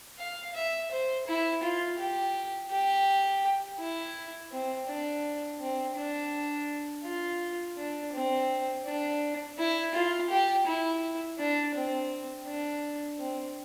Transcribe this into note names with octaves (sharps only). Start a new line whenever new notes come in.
F5
E5
C5
E4
F4
G4
G4
E4
C4
D4
C4
D4
F4
D4
C4
D4
E4
F4
G4
E4
D4
C4
D4
C4